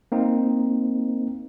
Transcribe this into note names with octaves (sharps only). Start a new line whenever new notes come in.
A#3 C4 D#4